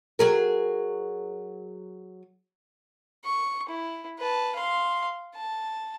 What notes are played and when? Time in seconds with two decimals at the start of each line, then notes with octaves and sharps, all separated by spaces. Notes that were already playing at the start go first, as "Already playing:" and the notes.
0.19 F#3 G#4 A#4
3.25 C#6
3.69 E4
4.18 B4 A5
4.55 F5 C6
5.35 A5